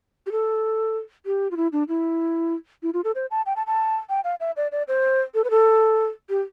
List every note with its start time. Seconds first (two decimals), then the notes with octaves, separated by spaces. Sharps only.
0.26 G4
0.32 A4
1.26 G4
1.51 F4
1.57 E4
1.72 D4
1.88 E4
2.83 E4
2.94 F4
3.04 A4
3.15 C5
3.31 A5
3.46 G5
3.56 A5
3.67 A5
4.09 G5
4.24 F5
4.40 E5
4.57 D5
4.72 D5
4.88 C5
5.34 A4
5.44 B4
5.50 A4
6.30 G4